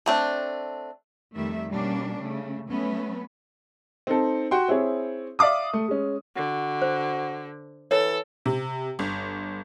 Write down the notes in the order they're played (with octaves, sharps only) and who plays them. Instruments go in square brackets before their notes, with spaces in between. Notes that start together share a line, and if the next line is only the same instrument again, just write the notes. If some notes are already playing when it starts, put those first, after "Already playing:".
[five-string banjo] A3 C4 D4
[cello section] F2 D#3 G3 A3 E5
B2 G3 A#3 C#4 D4
C#3 A3
F#3 A3 B3 C#4 B4
[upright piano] C4 D#4 A4
F#4 G5 C6
C4 E4 G#4 C#5
D5 E5 F5 D6 D#6
A3
G#3 C#4
[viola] D3 [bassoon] F#4
[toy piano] C5
[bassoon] E3 [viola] A4 [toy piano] C#5
[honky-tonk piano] C3
G1